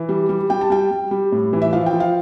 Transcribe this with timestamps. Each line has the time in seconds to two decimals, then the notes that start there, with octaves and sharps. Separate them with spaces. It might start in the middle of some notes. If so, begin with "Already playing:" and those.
Already playing: E3
0.09 G3
0.29 G3
0.50 G3 G5
0.61 A5
0.70 G3 G5
0.91 G3
1.11 G3
1.32 A2
1.53 E3
1.62 E5
1.73 F3 F5
1.86 G5
1.93 F3
2.00 F5